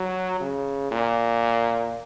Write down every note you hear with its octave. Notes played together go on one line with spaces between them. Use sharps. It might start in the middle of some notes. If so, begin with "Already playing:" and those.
Already playing: F#3
C#3
A#2